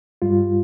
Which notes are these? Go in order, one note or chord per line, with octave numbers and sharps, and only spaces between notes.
G2 G3 F4